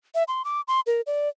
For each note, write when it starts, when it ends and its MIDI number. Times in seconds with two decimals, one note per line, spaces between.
0.15 0.23 76
0.28 0.42 84
0.45 0.61 86
0.68 0.80 84
0.87 1.01 70
1.07 1.29 74